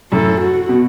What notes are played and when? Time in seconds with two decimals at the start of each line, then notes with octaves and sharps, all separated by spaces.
0.12 F#2 A2 A4
0.41 F#4
0.69 B2